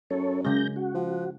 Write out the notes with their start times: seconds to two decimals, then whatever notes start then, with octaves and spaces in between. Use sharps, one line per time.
0.11 F#2 C#4 A4 C#5
0.45 C#3 G#3 G6 A#6
0.76 F#4
0.95 F3